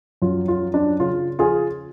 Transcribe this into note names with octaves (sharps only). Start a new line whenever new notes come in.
F#2 F4
F4
F3
D4
C#3 F4
F3 F4 G#4